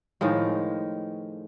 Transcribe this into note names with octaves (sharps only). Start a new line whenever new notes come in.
A2 D#3 F3 G#3